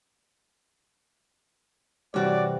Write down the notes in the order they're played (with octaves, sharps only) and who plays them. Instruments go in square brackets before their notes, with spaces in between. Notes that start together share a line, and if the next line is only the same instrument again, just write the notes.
[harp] G2 C3 E3 [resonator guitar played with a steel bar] F#4 C#5 [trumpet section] D5